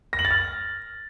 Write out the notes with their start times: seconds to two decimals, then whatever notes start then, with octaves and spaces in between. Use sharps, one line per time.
0.13 A#6
0.19 F#7
0.25 A6
0.31 F6